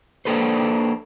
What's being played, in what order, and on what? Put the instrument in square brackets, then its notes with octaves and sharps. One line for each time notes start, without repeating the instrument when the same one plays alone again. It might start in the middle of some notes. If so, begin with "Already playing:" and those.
[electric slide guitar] A#3 D4 A4 B4 C5